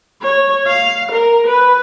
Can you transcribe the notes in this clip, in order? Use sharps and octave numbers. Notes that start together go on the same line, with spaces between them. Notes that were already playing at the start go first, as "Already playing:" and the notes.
C#5
F5
A#4
B4